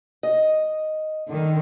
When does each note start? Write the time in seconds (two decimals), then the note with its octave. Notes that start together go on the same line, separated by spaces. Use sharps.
0.23 D#5
1.28 D3 D#3